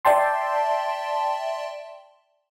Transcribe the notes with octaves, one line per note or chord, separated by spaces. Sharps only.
D5 E5 G5 A5 C6